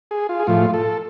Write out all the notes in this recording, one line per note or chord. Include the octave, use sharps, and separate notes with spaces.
G#4
F4
G#4
A2 F3 A3 F4
A4